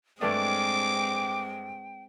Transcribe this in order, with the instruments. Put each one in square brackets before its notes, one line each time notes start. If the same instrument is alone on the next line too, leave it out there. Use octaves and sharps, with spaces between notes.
[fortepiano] G2 A3 D4 [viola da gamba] G#3 C4 [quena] G5 [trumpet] D6